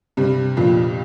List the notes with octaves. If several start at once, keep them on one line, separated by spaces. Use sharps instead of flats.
G2 C3
F2 A#2